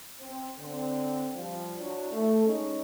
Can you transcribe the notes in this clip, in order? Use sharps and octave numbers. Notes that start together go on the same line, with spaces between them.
C4
D3 C4
F3 G3
F#3 D4 E4
A3
G#3 C#4 D#4